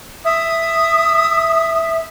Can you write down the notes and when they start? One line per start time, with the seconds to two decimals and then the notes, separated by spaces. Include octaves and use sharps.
0.25 E5 D#6